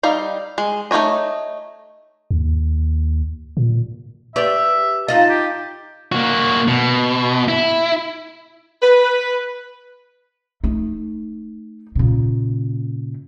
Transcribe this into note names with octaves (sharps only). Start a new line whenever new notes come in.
G3 D#4 F5
G#3
A3 D#4 E4 C#5 D#5
D#2
A#2
G4 B4 D5 E5
D#4 F4 D#5 A5
G4
A#3 F#4
B2
E4
B4
A3 D#4
A#2 C#3